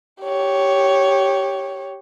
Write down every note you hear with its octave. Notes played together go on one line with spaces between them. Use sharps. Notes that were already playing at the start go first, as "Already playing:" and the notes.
G4 C#5